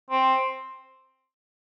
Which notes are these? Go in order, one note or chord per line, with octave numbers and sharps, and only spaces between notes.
C4